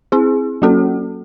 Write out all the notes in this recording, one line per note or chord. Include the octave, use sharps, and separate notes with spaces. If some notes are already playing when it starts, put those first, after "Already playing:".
C4 E4 G#4
F#3 A#3 C#4 F#4 A4